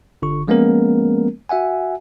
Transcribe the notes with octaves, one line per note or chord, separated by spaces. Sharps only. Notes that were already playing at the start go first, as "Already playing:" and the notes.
G1 D3 C#6
F3 G#3 A#3 B3 C#4 A#4
F#4 E5 F#5 G#5